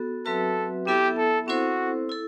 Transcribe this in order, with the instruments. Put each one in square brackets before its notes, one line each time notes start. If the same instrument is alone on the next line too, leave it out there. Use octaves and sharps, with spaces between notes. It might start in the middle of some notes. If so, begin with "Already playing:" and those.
Already playing: [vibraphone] B3 F#4 A4
[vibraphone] F#3 C4 F#4 B4 E5 [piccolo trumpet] A4
[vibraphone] B3 E4 A4 E5 [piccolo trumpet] G4
[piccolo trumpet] A4
[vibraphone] C4 E4 A4 C5 [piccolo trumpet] F#4
[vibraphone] E4 A4